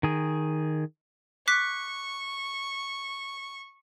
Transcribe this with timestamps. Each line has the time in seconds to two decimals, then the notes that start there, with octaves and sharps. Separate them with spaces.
0.03 D#3 G#4
1.48 C#6 D6 F#6 B6